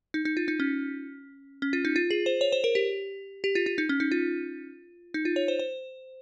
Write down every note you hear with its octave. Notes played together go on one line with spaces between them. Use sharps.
D#4
D#4
F4
D#4
C#4
C#4
F4
D#4
F4
G#4
C5
C#5
C5
A#4
G4
G4
F4
F4
D#4
C#4
D#4
F4
D#4
F4
C#5
C5
C5